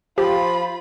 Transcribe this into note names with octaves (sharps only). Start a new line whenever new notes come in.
F3 F4 G4 B5